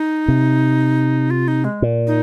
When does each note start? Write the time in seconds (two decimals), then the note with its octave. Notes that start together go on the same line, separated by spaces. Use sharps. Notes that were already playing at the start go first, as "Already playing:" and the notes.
Already playing: D#4
0.28 C3
1.30 F4
1.48 D#4
1.64 G#3
1.82 A#2
2.07 D#4